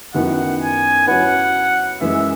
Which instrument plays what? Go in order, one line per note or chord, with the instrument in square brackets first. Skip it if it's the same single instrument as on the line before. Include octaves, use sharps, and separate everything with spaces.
[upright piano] F#2 D#3 F#3 B3 E4 [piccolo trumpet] F#5
[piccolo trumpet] G#5
[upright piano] F#3 C#4 E4 B4 [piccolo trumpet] F#5
[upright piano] F#2 E3 G#3 [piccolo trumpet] E5